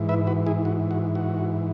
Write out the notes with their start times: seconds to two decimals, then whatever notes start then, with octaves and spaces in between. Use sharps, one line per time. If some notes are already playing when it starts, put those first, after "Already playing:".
Already playing: G#2 E3
0.09 B4 E5
0.27 F#4 B4
0.46 E4 G#4
0.65 F#4
0.91 F#4
1.15 F#4